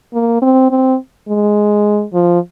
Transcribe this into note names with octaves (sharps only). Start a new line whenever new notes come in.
A#3
C4
C4
G#3
F3